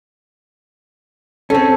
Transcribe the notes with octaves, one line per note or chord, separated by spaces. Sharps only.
C4 C#4 A4